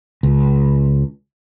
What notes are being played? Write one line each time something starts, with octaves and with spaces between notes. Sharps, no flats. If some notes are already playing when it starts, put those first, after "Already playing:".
C#2